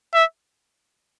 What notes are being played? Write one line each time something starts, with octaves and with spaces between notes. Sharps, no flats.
E5